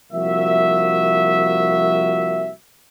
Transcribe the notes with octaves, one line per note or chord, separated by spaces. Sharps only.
C2 F3 A#3 F#4 E5